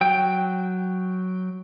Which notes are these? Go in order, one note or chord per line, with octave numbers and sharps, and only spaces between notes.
F#3 G5